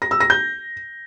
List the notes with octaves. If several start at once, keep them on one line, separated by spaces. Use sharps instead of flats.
A#6
E6
A#6
G6